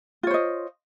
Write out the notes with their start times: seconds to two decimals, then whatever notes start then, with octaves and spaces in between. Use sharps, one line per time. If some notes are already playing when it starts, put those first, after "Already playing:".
0.23 F4
0.27 C#5
0.30 C5
0.34 D#5